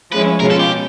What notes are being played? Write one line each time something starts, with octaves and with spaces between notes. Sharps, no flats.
F3 G#3 C#4 E4 B4
B2 G#3 C#4 F4 A#4
A4
G4